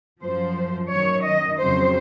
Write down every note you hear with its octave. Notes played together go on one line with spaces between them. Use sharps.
F#2 F3 C5
F#2 D#3 F#3 C#5
D#5
F2 C#3 F#3 C5